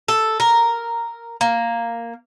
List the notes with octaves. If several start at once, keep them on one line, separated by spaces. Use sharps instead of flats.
A4
A#4
A#3